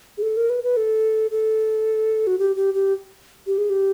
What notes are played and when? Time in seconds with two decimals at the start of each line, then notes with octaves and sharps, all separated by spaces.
0.18 G#4
0.22 A4
0.37 A#4
0.50 B4
0.63 B4
0.77 A4
1.31 A4
2.27 F#4
2.39 G4
2.56 G4
2.74 G4
3.47 G4
3.58 G#4
3.70 G4